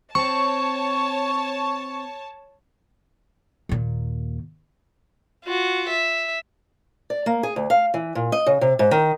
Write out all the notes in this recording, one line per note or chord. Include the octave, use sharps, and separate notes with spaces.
C4 C#5 A5 C#6
D#2 A#2
F4 F#4
E5
D5
A#3
G#4
D2
F5
E3
A#2
D#5
C#3
C3
G#2
D#3